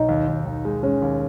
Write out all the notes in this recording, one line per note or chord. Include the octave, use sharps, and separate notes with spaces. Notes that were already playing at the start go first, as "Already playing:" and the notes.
Already playing: B1 D#4
D#2
D#2
D#2
G#3
G#3 C#4
D#2